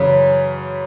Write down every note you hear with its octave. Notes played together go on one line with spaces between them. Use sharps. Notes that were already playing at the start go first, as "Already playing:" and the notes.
Already playing: F#2 C#3 E3